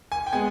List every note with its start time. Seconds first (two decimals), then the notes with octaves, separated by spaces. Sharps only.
0.12 G#5
0.26 G5
0.33 G#3 B3 G#5